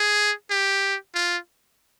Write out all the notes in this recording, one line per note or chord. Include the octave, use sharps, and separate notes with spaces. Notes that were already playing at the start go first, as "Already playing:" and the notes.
Already playing: G#4
G4
F4